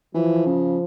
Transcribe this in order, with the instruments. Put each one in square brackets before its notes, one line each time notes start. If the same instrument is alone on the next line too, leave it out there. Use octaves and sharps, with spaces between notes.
[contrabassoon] E3 [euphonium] F3
[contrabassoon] C#3